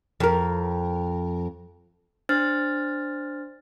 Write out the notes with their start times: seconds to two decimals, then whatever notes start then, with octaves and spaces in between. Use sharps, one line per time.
0.20 F2 A#4
2.29 D4 C5 F6 A6